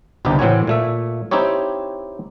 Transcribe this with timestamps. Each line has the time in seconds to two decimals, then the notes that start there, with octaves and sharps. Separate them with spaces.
0.25 G1 C2 G2 C3 D#4 G4
0.39 A2 E3 C4 F#4 C#5 G#5
0.67 A#2 A3 E5
1.31 C4 D#4 E4 G4 C#5